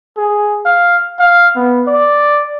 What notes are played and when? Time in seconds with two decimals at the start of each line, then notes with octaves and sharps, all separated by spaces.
0.17 G#4
0.66 F5
1.20 F5
1.56 B3
1.88 D5